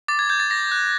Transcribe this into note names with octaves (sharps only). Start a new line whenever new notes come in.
D6 A6
G#6
G6 G#6
A6
D6 A#6
F#6